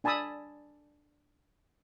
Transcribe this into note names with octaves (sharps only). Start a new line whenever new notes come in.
D4 G#5 A5 B5 D#6 E6